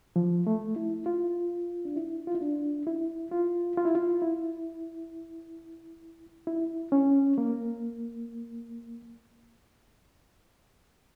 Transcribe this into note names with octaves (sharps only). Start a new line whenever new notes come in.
F3
A3
E4
F4
D4
E4
F4
E4
D4
E4
F4
F4
E4
F4
E4
E4
C#4
A#3